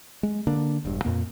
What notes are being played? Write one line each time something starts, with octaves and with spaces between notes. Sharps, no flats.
G#3
D3 A#3 D4
E1 G2
F2 A#2 A#3